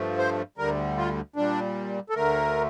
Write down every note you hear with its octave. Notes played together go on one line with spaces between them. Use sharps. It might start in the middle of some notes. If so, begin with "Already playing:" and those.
Already playing: G2 F3 A3
C5
D2 D3 G3 A#4
F4
A#2 G3 D4
A4
D2 D3 A3 A#4